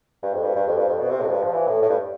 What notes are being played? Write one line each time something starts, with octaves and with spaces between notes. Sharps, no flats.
G2
F2
G2
G2
F2
G2
F2
B2
C3
A2
F2
G2
F3
E3
A2
A2
G2